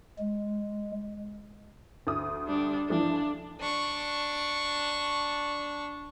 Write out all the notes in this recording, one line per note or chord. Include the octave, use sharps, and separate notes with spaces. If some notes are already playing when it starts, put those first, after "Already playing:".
G#3
D2 D#6
G3 D4
E3 F3 A3 D4
D4 C#6